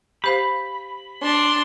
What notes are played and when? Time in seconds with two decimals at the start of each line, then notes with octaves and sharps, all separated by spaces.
0.24 G4 C5 F5 B5
1.22 D4 C6